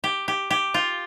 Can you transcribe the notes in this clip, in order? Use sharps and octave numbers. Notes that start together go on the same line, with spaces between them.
G4
G4
G4
F4